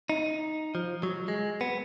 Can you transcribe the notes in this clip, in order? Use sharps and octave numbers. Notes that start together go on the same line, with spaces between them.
D#4
F3
F#3
G#3
B3